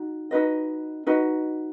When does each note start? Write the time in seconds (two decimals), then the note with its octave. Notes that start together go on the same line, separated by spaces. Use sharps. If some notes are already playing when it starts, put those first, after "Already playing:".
Already playing: D#4 F#4
0.31 D#4 F#4 B4 D#5
1.07 D#4 F#4 B4 D#5